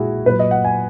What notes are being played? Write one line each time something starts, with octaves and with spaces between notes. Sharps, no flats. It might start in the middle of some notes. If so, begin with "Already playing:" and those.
Already playing: A#2 G#3 E4 F#4 G#4
A#2 F#3 B4
D#5
F#5
G#5